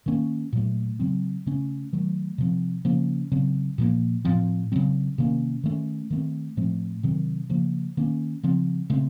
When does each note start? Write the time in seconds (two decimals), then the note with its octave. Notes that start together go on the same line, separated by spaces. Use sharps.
0.06 D#3 A#3 C#4
0.53 A#2 F#3 A3
1.00 C#3 F#3 C4
1.46 C#3 A3 C#4
1.93 D#3 F#3 A3
2.38 C3 F3 C4
2.85 C#3 F3 A#3 C#4
3.32 C#3 F#3 C4
3.78 A#2 F3 A#3
4.25 A2 F3 C4
4.72 C#3 F#3 C4
5.18 C3 D#3 A#3 C#4
5.64 D#3 A3 C#4
6.10 D#3 A3 C4
6.57 A2 F3 A3 C4
7.03 C3 D#3 F#3 C4
7.49 C#3 F3 A#3
7.97 D#3 A#3 C#4
8.43 C#3 F3 C4
8.90 C#3 A3 C4